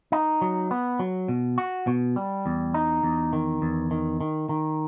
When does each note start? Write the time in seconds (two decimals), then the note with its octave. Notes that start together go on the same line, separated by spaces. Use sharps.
0.12 D#4
0.42 F#3
0.71 B3
0.99 F#3
1.28 B2
1.58 F#4
1.87 B2
2.16 G3
2.46 E2
2.74 D#4
3.03 E2
3.33 D#3
3.62 E2
3.91 D#3
4.21 D#3
4.49 D#3